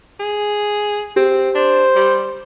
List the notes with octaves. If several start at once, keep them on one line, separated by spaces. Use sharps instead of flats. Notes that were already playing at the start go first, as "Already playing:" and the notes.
G#4
C4 G4
D4 C5
G3